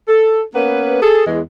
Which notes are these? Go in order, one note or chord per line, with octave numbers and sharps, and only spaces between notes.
A4
A#3 B3 C#4 B4
G#4 A4
E2 G#3